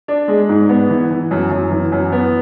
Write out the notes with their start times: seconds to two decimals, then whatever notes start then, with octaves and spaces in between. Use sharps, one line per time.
0.08 D4
0.28 G#3
0.49 G#2
0.69 B3
0.90 E3
1.10 E3
1.31 F#2
1.51 F#2
1.71 E3
1.92 F#2
2.12 B3